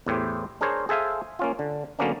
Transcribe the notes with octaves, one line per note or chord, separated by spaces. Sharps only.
E2 A2 G4 C5
D4 G#4 A#4 C5 C#5
G#4 A4 C5 E5 F5 G#5
A#3 C#4 F4
D3
D3 F#3 A#3 B3 C#4 D4